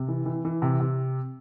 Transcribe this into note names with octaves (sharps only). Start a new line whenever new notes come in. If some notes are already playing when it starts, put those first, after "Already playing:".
Already playing: C3
E3
E3
E3
C3
C3